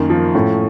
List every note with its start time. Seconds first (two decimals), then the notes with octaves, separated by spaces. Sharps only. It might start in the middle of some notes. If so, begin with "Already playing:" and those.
Already playing: F#2 D#3 A#3
0.10 F3
0.35 A2 C#4